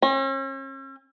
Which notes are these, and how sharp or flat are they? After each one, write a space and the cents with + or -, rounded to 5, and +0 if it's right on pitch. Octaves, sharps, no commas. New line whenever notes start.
C#4 -45